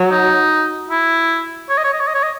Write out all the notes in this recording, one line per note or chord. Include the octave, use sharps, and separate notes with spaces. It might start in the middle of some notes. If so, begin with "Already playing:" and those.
Already playing: F#3
D#4
E4
C#5
D#5
C#5
D#5
C#5
D#5
C#5
D#5